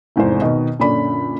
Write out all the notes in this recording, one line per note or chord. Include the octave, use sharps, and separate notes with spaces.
F1 E2 G#2 C5
B2 D#3 D#5
F#2 A#2 D3 C#4 D5 B5